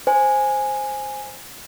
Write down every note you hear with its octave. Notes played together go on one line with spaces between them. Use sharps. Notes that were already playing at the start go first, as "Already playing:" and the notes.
C5 G#5